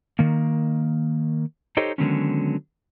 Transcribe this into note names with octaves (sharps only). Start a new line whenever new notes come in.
D#3 A#3
D#4 G4 A4 C5 C#5 D#5
D3 D#3 F#3 G#3 B3 C#4